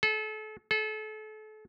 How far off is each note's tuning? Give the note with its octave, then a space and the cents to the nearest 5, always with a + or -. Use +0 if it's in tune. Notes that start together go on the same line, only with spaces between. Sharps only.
A4 -35
A4 -35